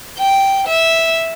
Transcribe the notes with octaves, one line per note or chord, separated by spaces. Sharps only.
G5
E5